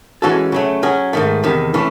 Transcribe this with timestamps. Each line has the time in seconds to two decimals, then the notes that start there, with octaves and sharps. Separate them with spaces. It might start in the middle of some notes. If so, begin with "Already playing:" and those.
0.22 E3 G#3 C#4 F#4 A4
0.52 C#3 F#3 A3
0.83 F#3 C#4 G#4
1.13 G#2 D#3 A3
1.44 E2 C3 D#3
1.74 E3 A3 C#4